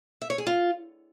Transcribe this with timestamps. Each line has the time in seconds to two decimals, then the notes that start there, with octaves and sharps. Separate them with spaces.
0.22 E5
0.30 C#5
0.38 G#4
0.47 F4